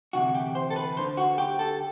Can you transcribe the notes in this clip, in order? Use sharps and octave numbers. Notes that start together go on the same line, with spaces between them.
D2 C3 E3 F#4
G4
C5
A4
B4
D2 D3 C5
F#4
G4
A4